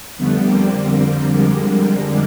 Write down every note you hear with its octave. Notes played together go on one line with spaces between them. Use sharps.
F2 D3 G3 A3 B3
A#3 C4
G#3 A#3